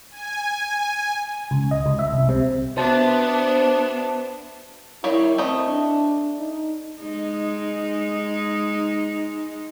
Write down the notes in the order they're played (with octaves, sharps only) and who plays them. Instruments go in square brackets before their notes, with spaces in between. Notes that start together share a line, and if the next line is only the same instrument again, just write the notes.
[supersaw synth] G#5
[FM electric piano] C#2
D#5
C#2
E5
C2
C3
[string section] B3 D4 [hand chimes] F#4 B4 E5 [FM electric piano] C5 A5
[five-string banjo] D#3 G3 C#5 [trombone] E4
[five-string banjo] A3 D#5 [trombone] C4
[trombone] D4
D#4
[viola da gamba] G#3 D#4